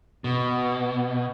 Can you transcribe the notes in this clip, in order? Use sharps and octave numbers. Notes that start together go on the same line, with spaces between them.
B2